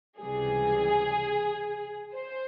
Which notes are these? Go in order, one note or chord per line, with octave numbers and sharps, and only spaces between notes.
C#2 C3 E3 G3 G#4
C5